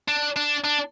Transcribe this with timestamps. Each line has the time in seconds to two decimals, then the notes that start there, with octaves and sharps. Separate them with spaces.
0.08 D4
0.36 D4
0.64 D4